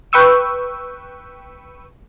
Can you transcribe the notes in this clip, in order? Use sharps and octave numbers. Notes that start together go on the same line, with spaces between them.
B4 G5 C#6 E6 D#7